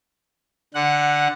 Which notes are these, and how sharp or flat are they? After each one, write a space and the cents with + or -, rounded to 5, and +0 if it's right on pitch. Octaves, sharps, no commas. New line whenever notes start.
D3 +0 F#5 +0